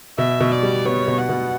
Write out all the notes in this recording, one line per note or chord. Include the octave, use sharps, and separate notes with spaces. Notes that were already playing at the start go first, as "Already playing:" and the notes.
B2 E5
B2
D5
G3
B3 C#5
B2
F#5
B2